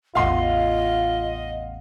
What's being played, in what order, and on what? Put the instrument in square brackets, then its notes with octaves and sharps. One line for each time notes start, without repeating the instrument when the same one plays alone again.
[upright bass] A1 E2 [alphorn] F4 [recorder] D#5 [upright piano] F5 F#5 C6